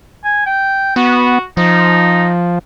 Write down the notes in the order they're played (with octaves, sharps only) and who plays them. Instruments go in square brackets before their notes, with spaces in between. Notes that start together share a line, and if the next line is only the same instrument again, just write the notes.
[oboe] G#5
G5
[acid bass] B3 [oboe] F#4
[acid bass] F3 [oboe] D#4